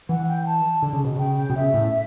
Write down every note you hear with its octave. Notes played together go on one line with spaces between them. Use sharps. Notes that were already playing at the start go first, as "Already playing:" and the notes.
E3 F#5
G5
A5
D3
C#3
B2
C#3 G5
G5
B2
C#3 E5
A2